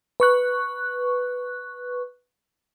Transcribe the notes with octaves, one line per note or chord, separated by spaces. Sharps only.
B4 C#6 F#6